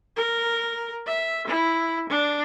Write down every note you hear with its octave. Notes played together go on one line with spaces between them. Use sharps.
A#4
E5
E4
D4